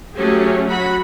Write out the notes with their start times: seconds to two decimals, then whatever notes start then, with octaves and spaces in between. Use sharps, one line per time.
0.15 F#3 A3 C#4 G4 G#4
0.68 F#3 F#4 F#5 B5